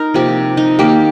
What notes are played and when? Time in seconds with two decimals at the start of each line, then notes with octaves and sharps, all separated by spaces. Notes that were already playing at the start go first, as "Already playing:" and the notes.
Already playing: D#4 A#4
0.14 C3 F3 A#3 G4
0.57 D#4
0.79 D#3 A#3 G4